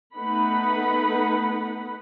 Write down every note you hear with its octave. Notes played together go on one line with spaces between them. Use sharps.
A3 B3 D#4 B4 F#5 B5